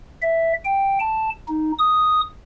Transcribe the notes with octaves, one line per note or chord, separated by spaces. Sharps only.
E5
G5
A5
D#4
D#6